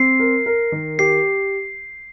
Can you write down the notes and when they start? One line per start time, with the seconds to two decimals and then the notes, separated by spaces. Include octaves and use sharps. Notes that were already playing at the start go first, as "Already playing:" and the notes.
Already playing: C4 C7
0.20 A#4
0.46 A#4
0.72 D#3
0.99 G4 C7